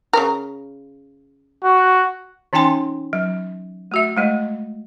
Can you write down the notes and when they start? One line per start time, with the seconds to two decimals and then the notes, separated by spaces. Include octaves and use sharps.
0.13 C#3 A#4
1.64 F#4
2.53 E3 C#4 D#4 G5 G#5 C6
3.13 F#3
3.92 A3 F#4 E5
4.17 G#3 A3 D#5